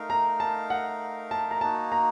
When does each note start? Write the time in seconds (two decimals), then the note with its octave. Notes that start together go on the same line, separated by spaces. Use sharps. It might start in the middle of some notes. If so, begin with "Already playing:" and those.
Already playing: A3 D#4 A#4 F5
0.10 A#5
0.40 A5
0.70 F#5
1.31 A5
1.51 A#5
1.61 A#3 D#4 F#4 A5
1.92 A#5